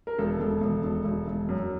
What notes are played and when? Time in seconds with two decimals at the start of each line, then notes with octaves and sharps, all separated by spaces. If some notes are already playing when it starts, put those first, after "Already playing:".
0.07 A#4
0.18 E1 A4
0.40 E1
0.61 E1
0.84 E1
1.05 E1
1.27 E1
1.49 F#2